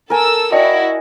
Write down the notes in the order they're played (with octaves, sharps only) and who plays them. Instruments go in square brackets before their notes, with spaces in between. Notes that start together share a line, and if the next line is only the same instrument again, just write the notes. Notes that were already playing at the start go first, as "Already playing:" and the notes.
[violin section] A4 E6 [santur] A#4 G#5
[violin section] E4 F#4 [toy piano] D5 G5 A5 [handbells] D#5